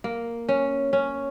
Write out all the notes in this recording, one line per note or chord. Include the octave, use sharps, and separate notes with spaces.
A#3
C#4
C#4